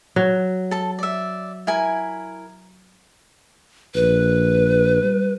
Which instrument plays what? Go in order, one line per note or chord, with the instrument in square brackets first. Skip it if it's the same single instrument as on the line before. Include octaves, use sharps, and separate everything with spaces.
[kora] F#3
[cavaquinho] A4 A5
D5 E5
E4 A#4 G#5
[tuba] A#1 [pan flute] B4
[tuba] G3